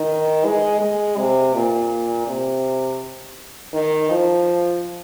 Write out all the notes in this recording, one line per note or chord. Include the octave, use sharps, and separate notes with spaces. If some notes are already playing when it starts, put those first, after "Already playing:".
Already playing: D#3
G#3
G#3
C3
A#2
C3
D#3
F3